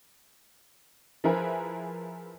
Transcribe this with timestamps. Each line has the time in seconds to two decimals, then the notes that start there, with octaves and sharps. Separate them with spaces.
1.24 F3 E4 G#4 A#4 B4